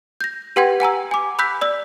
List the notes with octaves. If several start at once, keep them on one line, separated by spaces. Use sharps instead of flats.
G6 A#6
G4 B4 F#5 G5 C6 G#6
F#5 G#5 A#5 E6
G#5 D6
B5 E6 F#6 G6 B6
D5 E6